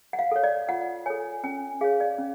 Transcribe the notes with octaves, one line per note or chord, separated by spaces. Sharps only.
F#5
F5
A4 C#5
D5
F4 F#5
A4 C#5 G#5
C#4 G#5
G#4 C#5 F5
D5
C#4